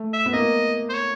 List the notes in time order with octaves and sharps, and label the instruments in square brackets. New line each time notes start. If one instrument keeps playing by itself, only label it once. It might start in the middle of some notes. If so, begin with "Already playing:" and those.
Already playing: [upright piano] A3
[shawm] E5
[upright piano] B3
[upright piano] A#3 [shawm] D#5
[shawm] C5
C#5